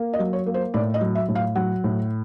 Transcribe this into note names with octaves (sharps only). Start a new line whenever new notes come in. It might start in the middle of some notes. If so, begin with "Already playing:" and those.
Already playing: A#3
D#5
F#3
C#5
A#3
C5
A2 D5
D#5
F#3
E5
A2
F5
F#3 F#5
A2